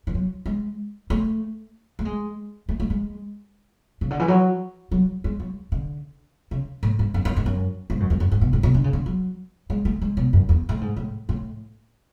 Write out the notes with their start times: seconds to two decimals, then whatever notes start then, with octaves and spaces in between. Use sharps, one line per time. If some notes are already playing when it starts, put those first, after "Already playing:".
0.07 E3
0.14 F#3
0.46 G#3
1.10 A3
1.99 A3
2.05 G#3
2.69 A3
2.80 A3
2.90 G#3
4.01 C#3
4.10 D3
4.19 E3
4.28 F#3
4.91 F#3
5.24 G#3
5.40 F#3
5.72 D3
6.51 C#3
6.83 A2
6.99 G#2
7.14 F#2
7.25 F#2
7.37 G#2
7.46 F#2
7.90 G#2
8.00 F#2
8.10 E2
8.20 F#2
8.32 G#2
8.41 B2
8.53 A2
8.63 B2
8.74 D3
8.84 C#3
8.93 D3
9.06 F#3
9.70 G#3
9.85 A3
10.02 G#3
10.17 B2
10.33 F#2
10.49 E2
10.69 A2
10.81 G#2
10.96 A2
11.29 A2